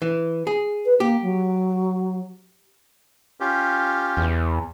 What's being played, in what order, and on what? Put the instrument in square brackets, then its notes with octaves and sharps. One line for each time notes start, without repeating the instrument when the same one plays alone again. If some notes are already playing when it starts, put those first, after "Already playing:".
[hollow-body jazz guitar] E3
G#4
[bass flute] B4
[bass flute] A#3 [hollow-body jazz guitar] G4
[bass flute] F#3
[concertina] C#4 F4 G4
[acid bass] E2